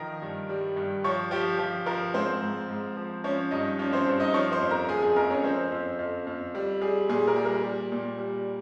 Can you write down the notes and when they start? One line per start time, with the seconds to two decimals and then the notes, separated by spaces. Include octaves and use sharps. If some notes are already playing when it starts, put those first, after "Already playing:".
Already playing: D#3 F3 A#4 A#5
0.22 G2
0.49 G3
0.76 G2
1.04 F3 C#5 C#6
1.31 F3 G4 G5
1.59 F3
1.86 F3 A#4
2.14 G#2 C4 C5
2.41 G#2
2.69 G#2
2.97 F3
3.24 F3 C#4 C#5
3.51 G2 D#4 D#5
3.79 F3 C#4 C#5
3.92 C4 C5
4.06 G2
4.20 D#4 D#5
4.34 F3 C#5 C#6
4.52 C5 C6
4.61 F2
4.71 A#4 A#5
4.89 F2 G#4 G#5
5.02 G#4 G#5
5.16 F2 A#4 A#5
5.30 C#4 C#5
5.44 F3 C4 C5
5.72 F2
5.99 F2
6.27 F2
6.55 G3
6.81 G3 G#4
7.09 A#2 G#4
7.27 A#4
7.36 G3
7.45 A#4
7.64 G3
7.92 A#2
8.19 G3